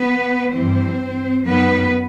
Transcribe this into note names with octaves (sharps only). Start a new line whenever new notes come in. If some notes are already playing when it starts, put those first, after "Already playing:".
Already playing: B3 B4
G2 E3 C4 C5
F#2 D#3 B3 B4